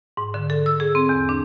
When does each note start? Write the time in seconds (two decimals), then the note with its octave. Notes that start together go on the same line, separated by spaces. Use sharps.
0.17 G#2
0.34 D3
0.50 A4
0.66 E6
0.80 G#4
0.95 C4
1.09 E2
1.29 D4